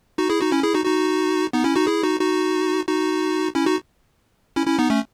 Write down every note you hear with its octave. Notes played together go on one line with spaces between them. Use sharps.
D#4 F#4
E4 G#4
D#4 F#4
C#4 E4
E4 G#4
D#4 F#4
D#4 F#4
B3 D#4
C#4 E4
D#4 F#4
E4 G#4
D#4 F#4
D#4 F#4
D#4 F#4
C#4 E4
D#4 F#4
C#4 E4
C#4 E4
B3 D#4
A3 C#4